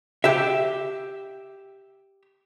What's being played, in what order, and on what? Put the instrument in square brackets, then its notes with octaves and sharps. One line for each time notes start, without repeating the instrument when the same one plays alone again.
[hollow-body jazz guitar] G4 E5